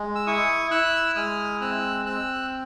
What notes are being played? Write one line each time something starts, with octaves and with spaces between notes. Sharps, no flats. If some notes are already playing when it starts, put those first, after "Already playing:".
Already playing: G#3
E6
E4 C#6 D#6
E4 E6 F#6
G#3 D#6 F6
C4 E6 F#6
C4 E6 F#6